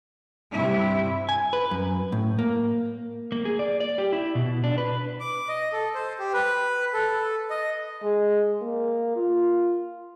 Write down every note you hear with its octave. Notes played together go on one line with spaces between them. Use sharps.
G2 C3 E4
G#5
B4
F#2
A2
A#3
A#3
G#4
D5
D5
G4
E4
B2
D4
B4
D6
D#5
A4
C5
G4
B4
A4
D#5
G#3
A#3
F4